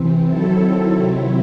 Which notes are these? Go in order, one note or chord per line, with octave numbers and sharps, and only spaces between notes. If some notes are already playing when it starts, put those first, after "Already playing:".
Already playing: C3 E3 C4
D#3 F#3 C4 E4 A4
C3 D#3 F#3 C4 E4